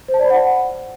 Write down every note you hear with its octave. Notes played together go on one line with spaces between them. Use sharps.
C5
A5
D5
B5
F#5